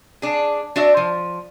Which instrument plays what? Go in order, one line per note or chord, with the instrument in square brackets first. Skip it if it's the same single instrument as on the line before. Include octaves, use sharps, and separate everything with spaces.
[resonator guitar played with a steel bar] D4 G#4
D4 F#4 D5 E5
F3